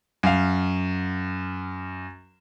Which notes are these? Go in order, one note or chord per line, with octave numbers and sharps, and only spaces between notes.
F#2 F5